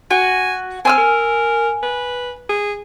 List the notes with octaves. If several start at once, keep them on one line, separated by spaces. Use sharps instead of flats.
F#4 G#5
C4 G#5 E6 F6
A#4
B4
G#4